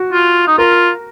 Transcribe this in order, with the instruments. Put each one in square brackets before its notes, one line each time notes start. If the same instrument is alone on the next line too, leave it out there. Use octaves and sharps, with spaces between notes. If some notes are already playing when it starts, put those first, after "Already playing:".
Already playing: [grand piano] F#4
[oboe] F4
D#4
[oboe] F4 [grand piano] A#4